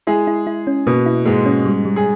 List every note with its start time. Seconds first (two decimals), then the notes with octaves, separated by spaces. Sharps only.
0.07 G#3 E4 G#4
0.27 E4
0.47 E4
0.67 C#4
0.87 B2 A#3 B3
1.06 E4
1.25 G#2 G#3 A#3
1.46 C#4
1.66 G3
1.85 G3
1.96 G#4